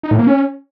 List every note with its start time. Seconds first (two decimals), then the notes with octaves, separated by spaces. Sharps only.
0.03 D#4
0.11 A2
0.19 A#3
0.27 C#4